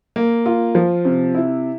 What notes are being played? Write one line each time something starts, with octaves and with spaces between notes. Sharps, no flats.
A#3
F4
F3
C3
E4